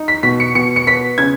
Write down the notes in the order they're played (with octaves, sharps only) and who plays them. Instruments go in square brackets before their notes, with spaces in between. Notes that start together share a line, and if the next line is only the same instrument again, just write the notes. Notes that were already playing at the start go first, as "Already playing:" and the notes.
Already playing: [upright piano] D#4
B6
B2 B6
C#7
B2 C#7
C#7
B3 B6
C#3 G#6